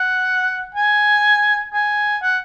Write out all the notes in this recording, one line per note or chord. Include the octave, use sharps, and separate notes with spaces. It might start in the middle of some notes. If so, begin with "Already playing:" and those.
Already playing: F#5
G#5
G#5
F#5